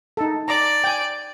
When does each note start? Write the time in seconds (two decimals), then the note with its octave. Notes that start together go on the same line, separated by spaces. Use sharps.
0.17 D#4 A4
0.48 D5 A#5 D6
0.84 G5 G#5